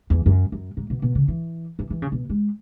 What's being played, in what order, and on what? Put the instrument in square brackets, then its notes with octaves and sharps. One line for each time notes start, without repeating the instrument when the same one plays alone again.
[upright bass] E2
F#2
F#2
G#2
B2
B2
C#3
E3
E3
E3
C#3
B2
G#3